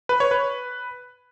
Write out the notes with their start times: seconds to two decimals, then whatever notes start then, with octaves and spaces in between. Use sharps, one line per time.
0.09 B4
0.20 C#5
0.31 B4